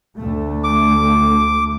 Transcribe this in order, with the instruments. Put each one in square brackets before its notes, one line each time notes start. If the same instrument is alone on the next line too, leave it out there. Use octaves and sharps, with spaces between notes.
[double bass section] D2 A3
[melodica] D6